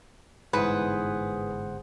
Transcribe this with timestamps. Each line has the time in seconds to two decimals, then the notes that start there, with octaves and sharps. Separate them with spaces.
0.53 G1 G#2 E3 G#4 B4 C5 F#5